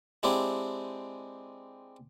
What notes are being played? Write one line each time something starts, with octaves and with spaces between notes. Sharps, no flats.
G#3 C4 D4 E4 G4